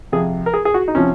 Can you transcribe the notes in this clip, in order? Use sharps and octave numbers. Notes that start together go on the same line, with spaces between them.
F2 C3 F3 G#4
A#4
G#4
G#4
F#4
D#4
C3 F3 C#4